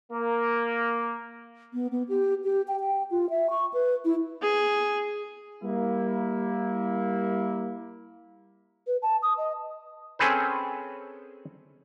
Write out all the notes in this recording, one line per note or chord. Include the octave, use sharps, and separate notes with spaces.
A#3
B3
B3
G4
G4
G5
G5
F4
E5
C#6
B4
E4
G#4
G3 A#3 E4
B4
A5
D#6
D#5
C4 C#4 G#4 A4 B4 C5